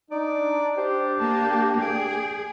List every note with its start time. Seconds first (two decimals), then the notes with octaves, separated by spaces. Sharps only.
0.11 D4 D#4 D5
0.77 G4 C5
1.20 A#3 A5
1.82 G#4 G5